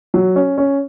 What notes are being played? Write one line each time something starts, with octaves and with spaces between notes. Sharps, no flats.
F#3
C#4
C#4